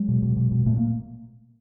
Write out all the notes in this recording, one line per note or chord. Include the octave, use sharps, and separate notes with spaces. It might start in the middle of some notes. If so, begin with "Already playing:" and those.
Already playing: F#3 G#3
B2
B2
B2
B2
A#2 A3
A#3